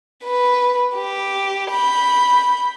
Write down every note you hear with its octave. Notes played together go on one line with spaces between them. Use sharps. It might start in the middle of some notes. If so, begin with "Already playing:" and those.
B4
G4
B5 G6